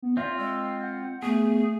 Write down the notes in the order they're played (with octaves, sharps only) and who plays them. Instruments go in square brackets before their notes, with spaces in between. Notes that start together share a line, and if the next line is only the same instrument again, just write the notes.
[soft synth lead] B3
[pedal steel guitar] C4 F4 [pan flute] D5 [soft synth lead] E5
[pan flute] G#3 [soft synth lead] E6
[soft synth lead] F#5
[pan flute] A3 [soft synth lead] B3 [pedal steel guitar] G#4